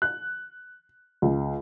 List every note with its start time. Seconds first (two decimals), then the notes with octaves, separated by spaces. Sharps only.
0.02 F#6
1.22 C#2